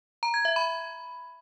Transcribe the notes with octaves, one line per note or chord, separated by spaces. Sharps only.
A#5
G#6
E5
B5